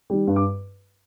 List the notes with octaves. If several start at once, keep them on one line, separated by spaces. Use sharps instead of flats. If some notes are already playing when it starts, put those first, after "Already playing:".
D#3 G3
G2
D6